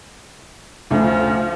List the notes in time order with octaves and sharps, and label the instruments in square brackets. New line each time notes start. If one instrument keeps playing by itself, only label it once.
[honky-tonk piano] D2 C#3 A3 [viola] F3